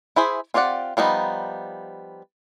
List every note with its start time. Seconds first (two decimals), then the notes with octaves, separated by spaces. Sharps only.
0.16 E4 G#4 C5 E5
0.54 C4 F4 G4 D5 F#5
0.97 F3 G3 B3 D#4